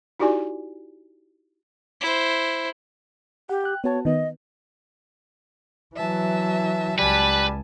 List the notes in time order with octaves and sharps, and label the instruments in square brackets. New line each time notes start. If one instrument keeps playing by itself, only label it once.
[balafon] D#4 E4 F#4 G4 D5 G#5
[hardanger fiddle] E4 C5
[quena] G4 [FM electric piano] F#5
[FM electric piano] G5 F#6
[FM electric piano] B3 F#4 A5 [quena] C#5
[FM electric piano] D#3 B3 [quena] D#5
[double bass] E3 F#3 [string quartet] E5 A5
[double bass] C#2 [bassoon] G3 [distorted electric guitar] B4 [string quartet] G#5 A5